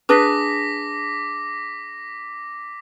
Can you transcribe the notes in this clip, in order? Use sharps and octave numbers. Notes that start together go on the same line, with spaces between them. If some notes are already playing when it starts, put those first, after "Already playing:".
D4 G#4 B4 D6 A#6 B6